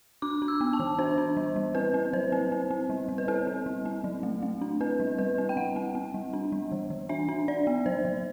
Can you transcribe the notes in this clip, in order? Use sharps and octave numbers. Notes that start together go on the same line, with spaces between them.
D4 D6
D4
E6
B3
A5
E3
D4 C5
D4
G3
G3
C4 B4
C4
F#3 C5
C4
C4
C4
G3
G3
B4
C4 A4
C4
G3
C4
F#3
A3
A3
D4
C4 B4
G3
G3 B4
C4
G5
G3 F#5
C4
C4
G3
D4
G3
E3
E3
D4 E5
D4
D4 D5
B3
F#3 C5
F#3